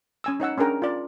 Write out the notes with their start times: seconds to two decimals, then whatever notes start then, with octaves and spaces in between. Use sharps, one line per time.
0.24 C#4 G#5 E6
0.40 D#4 C#5 F#5 E6
0.58 C#4 D4 G#4 A#4 G5
0.82 F4 D5